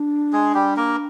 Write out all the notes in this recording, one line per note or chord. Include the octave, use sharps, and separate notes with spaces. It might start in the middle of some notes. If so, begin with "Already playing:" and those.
Already playing: D4
G#3 G#4
G3 G4
A#3 A#4